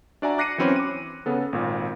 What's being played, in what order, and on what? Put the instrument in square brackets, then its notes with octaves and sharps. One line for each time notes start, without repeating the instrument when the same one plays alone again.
[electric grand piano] D4 F#4 D5 E5 G#5 A#5
D6 F#6 A#6 C7 C#7 D#7
E3 F#3 C4 C#4 B5
D6 D#7
C#3 B3 A4
G#1 A#2